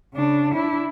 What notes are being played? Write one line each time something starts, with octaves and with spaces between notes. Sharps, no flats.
C#3 D4
D4 E4